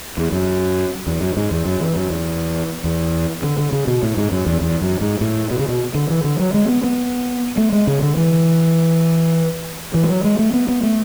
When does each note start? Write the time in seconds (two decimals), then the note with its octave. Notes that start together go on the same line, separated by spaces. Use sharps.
0.18 E2
0.32 F#2
1.07 E2
1.21 F#2
1.37 G#2
1.51 E2
1.66 F#2
1.81 E3
1.96 F#2
2.10 E2
2.84 E2
3.43 D3
3.58 D3
3.72 C#3
3.87 B2
4.03 A2
4.17 G#2
4.32 F#2
4.46 E2
4.62 E2
4.81 F#2
5.01 G#2
5.21 A2
5.50 B2
5.59 C#3
5.69 B2
5.95 D3
6.10 E3
6.24 D3
6.39 F#3
6.54 G#3
6.68 B3
6.84 B3
7.57 A3
7.72 G#3
7.87 C#3
8.02 D3
8.17 E3
9.94 E3
10.03 G#3
10.09 F#3
10.24 G#3
10.39 A3
10.53 B3
10.68 B3
10.83 A3